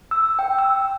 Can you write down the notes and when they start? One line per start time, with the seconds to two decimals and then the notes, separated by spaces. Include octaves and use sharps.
0.11 E6
0.39 G5
0.59 E6